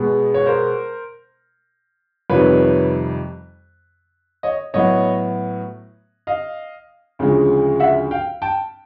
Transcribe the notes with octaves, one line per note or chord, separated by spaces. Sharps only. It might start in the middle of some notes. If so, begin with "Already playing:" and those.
Already playing: B2 G#3 B3
C#5
A#4 C5
F2 C3 D#3 G3 B4 C#5
C#5 D#5
A2 F#3 B3 C#5 D#5
D#5 F5
D2 C#3 F3 G#3
E5 F#5
F5 G5
G5 A5